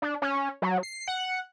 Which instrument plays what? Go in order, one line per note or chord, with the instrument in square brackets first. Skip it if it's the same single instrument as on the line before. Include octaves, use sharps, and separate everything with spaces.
[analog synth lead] D4
C#4
F#3
C7
F#5